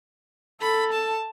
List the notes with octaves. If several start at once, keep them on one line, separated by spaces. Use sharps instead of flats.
A4 B5
A5